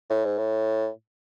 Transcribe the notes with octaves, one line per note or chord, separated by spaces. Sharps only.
A2
G#2
A2